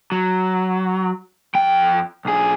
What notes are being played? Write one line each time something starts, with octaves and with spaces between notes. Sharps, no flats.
F#3
F2 G5
B1 G#4